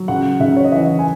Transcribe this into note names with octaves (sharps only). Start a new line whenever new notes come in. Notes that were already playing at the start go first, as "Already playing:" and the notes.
Already playing: F#3
C#3 F#5
C#3 E5
C#5
D#5
E3 E5
G#5